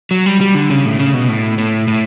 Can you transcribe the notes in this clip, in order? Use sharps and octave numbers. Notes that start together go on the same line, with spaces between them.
F#3
G3
G3
D3
C#3
A2
C#3
B2
A2
A2
A2